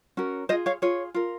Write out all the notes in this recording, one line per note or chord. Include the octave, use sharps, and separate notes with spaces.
C#4 F#4 A#4
F4 G#4 C5 D#5
C#5 F5
F4 G#4 C#5
F4 A#4